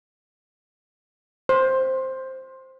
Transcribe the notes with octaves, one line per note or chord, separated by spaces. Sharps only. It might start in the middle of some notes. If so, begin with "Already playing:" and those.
C5